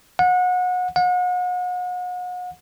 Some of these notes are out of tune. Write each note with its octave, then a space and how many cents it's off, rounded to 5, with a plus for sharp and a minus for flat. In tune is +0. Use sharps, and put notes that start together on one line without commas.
F#5 -30
F#5 -40